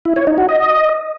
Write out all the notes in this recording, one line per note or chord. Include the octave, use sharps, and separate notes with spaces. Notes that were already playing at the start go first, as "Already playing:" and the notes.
E4
C#5
D#4
F#4
D#5